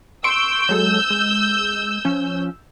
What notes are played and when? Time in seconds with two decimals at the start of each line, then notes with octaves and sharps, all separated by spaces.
0.24 C6 C#6 E6 G6 D7
0.69 F#3 G#3 A4
1.10 G#3
2.05 F3 C#4